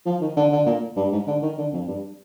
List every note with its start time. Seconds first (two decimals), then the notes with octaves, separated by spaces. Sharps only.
0.06 F3
0.21 D#3
0.37 D3
0.52 D3
0.66 A#2
0.96 G2
1.12 G#2
1.27 D3
1.42 D#3
1.58 D3
1.73 F2
1.88 G2